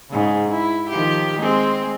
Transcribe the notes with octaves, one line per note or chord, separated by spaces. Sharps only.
G#2 C#3
E4
D#3 F3 G4
G#3 C4